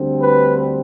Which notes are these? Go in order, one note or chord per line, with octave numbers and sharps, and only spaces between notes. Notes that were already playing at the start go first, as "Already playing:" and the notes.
Already playing: D2 D3 G3 C4
B4